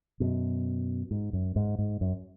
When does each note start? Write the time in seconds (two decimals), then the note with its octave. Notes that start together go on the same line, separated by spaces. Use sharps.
0.20 F#2 B2
1.11 G#2
1.33 F#2
1.56 G#2
1.79 G#2
2.01 F#2